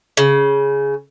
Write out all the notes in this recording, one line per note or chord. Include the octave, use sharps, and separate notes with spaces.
C#3